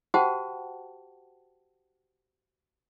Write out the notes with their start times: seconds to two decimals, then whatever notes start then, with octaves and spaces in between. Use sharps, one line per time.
0.14 F#4 G4 C5 F#5 G5 A5